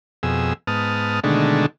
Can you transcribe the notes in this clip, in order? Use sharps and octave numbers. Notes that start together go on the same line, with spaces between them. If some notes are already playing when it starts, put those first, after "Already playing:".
F2 B2 G#4 E6
G#2 B3 A5 D#6 F6
B2 D3 D#3 G#3 A3 D4